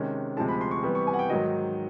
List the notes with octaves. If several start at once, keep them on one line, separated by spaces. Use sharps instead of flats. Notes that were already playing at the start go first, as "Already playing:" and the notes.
Already playing: C3 D#3 G#3 C#4
D2 C3 F3 G#3 A5
B5
C6
C#6
C3 E3 G3 B3
C#6
G#5
F#5
G5
G#2 D#3 F#3 D#5